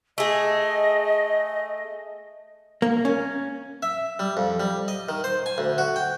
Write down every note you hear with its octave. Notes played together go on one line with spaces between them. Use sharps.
A3 G#4 D#5
A#3
C#4
E5
G3
F2
G3
D#5
D#3
C5
G#5
D2
F#4
G5